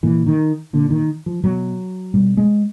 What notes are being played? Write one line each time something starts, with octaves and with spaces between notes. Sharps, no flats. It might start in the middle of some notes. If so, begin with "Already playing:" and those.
A#2 E3
D#3
A#2 D3
D#3
F3
B2 F#3
B2 G3
G#3